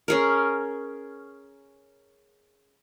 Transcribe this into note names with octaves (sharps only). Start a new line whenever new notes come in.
C#4 G#4 A#4